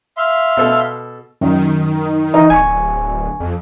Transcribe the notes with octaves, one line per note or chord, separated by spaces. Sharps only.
E5 F5 C6
B2 A4
F#2 D#3
E3 D#4
D1 G#5 C#6
F2